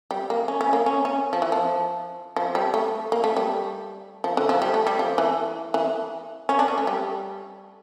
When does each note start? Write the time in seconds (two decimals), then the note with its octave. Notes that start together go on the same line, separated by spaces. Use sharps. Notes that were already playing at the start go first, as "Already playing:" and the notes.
0.11 G3
0.30 A#3
0.48 C#4
0.61 C#4
0.73 A#3
0.86 C#4
1.05 C#4
1.33 F3
1.42 E3
1.52 F3
2.36 F3
2.55 G3
2.74 A3
3.12 A#3
3.24 A3
3.37 G3
4.24 F3
4.37 D3
4.49 F3
4.62 G3
4.74 A3
4.87 G3
4.99 F3
5.18 E3
5.74 E3
6.49 C#4
6.59 D4
6.68 C#4
6.78 A3
6.87 G3